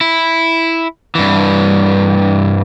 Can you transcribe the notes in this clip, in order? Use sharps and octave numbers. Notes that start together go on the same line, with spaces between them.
E4
G2 E3